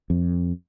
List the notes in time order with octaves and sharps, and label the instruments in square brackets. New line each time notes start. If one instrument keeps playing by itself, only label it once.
[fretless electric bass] F2